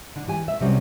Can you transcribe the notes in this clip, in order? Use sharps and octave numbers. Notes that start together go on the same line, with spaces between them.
D3
E3 G4 G#5
E5
C3 F#3 G3 C#4